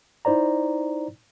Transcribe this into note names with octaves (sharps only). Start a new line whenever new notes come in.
D#4 E4 C5 D5 A#5